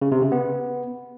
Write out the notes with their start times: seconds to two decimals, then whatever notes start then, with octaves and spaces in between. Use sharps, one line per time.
0.02 C#3
0.12 C3
0.22 C#3
0.32 B3